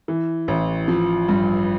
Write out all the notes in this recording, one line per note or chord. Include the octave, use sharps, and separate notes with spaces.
E3
A1
F3
G2